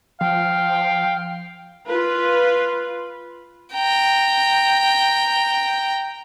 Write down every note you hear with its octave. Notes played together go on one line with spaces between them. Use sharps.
F3 F5 G5
F4 B4
G5 A#5